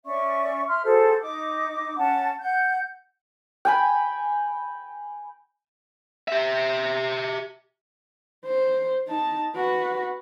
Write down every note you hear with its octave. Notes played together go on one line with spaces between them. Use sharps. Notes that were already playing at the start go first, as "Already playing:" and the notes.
C#4 D5 E5 C#6
E5 C6 F6
F#4 G#4 A4 C5
D#4 D6
C#4 F#5 A5
F#5 G6
G5 G#5 B5
G4 E5
C5
D#4 A5
F#4 B4